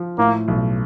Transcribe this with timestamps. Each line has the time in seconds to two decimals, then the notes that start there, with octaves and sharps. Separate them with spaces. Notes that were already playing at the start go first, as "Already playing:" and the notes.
Already playing: F3
0.18 A2 A#3
0.48 B1